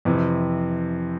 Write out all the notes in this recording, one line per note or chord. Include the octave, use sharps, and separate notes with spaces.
F2 C3 E3